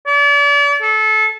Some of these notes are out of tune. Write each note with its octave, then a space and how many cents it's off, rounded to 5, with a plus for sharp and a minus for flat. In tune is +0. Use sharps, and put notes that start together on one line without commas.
D5 -40
A4 -25